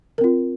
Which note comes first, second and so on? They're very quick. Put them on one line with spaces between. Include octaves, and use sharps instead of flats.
A#4 C4 F4